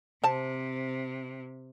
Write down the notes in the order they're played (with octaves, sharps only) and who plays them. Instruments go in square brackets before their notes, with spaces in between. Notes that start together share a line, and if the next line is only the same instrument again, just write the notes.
[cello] C3 [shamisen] C4 A5